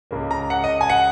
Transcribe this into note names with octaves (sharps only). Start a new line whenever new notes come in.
C#2 C#3 A#3
A#5
F#5
D#5
G#5
F#5